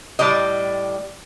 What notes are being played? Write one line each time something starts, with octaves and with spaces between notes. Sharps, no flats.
A2 G3 D5 D#5